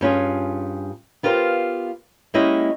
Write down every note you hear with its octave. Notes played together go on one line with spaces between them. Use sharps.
G2 C#4 F4 G#4
B3 F4 G4 A#4 C5 F5
G#3 A#3 C#4 E4 G4 D#5